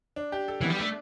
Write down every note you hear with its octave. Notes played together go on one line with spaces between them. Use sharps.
D4
G4
A4
E3 B3
G3
A3 D4